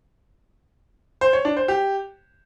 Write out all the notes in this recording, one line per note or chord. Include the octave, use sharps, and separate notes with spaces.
C5
C#5
D4
C5
G4